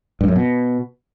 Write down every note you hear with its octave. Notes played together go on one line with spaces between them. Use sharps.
G2
F#2
B2